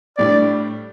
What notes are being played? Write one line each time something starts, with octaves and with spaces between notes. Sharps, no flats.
A2 G3 D4 D5